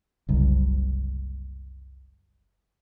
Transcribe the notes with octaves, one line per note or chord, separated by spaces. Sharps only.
F#1 C2